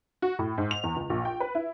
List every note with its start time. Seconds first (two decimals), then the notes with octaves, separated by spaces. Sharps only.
0.22 F#4
0.39 A2
0.58 G#2
0.71 F7
0.84 E2
0.96 C#2
1.10 A#1
1.25 G5
1.40 B4
1.55 E4